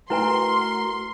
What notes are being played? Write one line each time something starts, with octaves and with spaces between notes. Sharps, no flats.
A3 E4 F#4 A#4 B4 G#5 C6